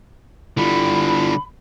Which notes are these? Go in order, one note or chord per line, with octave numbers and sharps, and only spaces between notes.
D3 G3 E4 F4 B5